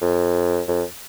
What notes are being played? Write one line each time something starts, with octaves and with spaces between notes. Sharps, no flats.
F2
F2